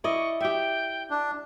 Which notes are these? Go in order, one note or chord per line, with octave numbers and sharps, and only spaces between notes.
E4 D5 D#5 C#6
G4 E5 G5
D4